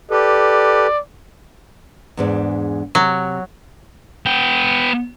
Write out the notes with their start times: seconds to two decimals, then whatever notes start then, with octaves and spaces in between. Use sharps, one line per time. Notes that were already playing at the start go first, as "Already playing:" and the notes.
0.11 G4 A4 B4 D5
2.17 E2 G#2 D4
2.95 C3 F#3
4.26 B3 G5